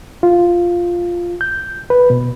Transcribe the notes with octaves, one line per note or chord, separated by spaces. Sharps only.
F4
G6
B4
B2